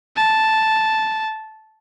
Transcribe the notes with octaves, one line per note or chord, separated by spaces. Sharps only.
A5